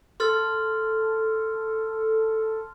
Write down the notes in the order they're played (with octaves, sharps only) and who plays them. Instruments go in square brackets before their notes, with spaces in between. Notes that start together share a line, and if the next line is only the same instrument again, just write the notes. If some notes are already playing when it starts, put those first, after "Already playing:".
[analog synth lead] A4 [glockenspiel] C6 F6 A6